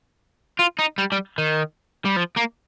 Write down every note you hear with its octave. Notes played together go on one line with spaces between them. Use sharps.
F4
D#4
G3
G3
D#3
G3
F3
A#3